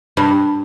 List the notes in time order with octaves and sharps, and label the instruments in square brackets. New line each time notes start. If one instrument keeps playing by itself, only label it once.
[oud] G2 [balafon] D4